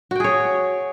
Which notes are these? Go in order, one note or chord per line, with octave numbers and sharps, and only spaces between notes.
F#4 G#4 C#5 G5